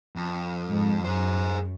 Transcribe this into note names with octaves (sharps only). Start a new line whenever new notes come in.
F2
G#2
F#2 G#4 C5